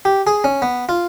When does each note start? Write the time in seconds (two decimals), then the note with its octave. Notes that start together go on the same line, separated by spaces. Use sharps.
0.05 G4
0.27 G#4
0.44 C#4
0.62 B3
0.89 F4